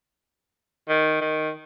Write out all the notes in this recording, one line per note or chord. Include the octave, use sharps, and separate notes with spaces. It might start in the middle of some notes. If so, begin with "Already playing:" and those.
D#3
D#3